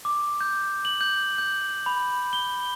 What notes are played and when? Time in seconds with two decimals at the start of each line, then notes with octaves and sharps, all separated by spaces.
0.05 D6
0.41 G6
0.85 F#7
1.01 G6
1.38 G6
1.86 B5
2.33 G7